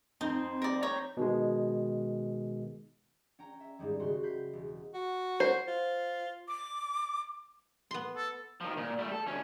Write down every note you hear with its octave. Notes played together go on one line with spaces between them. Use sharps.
F2 C4 D#4
A#4 D5
C#5 A#5
B2 D#3 G#3
C#4 G5 A#5
E5
G#2 D#3 G3 G#3
F#1 C#3 F#4 C6
B5 G6 B6 C7
E1
F#4
C5
F4
D6
B3 C6
A4
D#3 F3
A#2
G3 A3
A4
D2 C#4